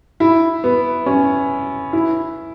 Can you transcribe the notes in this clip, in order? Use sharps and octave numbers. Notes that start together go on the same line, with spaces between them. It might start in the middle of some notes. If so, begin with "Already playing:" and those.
E4
B3
C#4
E4